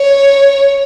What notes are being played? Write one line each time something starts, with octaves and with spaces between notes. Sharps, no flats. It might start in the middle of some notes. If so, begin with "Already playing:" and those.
Already playing: C#5